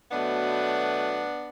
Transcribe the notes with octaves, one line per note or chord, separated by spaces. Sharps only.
B2 F#3 A3 B3 D4